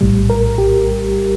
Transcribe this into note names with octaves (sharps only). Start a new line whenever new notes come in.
A#1 A2 G3
A#4
G4